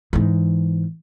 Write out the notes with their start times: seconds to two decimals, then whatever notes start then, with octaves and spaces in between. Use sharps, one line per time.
0.13 G#2 E3